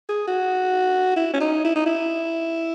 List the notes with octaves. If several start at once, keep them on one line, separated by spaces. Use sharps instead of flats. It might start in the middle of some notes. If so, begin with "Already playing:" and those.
G#4
F#4
E4
C#4
D#4
E4
D#4
E4